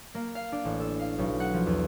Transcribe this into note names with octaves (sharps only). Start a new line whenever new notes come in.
A#3
F5
D4
A1
A4
F5
B1
F#5
F3
E2